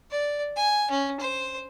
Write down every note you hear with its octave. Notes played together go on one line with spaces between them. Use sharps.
D5
G#5
C#4
C5